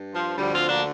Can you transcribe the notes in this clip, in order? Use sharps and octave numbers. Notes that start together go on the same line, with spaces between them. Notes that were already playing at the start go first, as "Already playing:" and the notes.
Already playing: G2
F3
D2 D3 F3 G3
C4 F4
A#3 D4